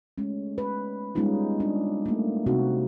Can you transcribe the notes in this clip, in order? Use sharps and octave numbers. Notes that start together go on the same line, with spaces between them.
G#3 A3 C#4
B4
G3 G#3 B3 C#4 D#4 F4
D4
A3 A#3
C3 C4 D#4 F#4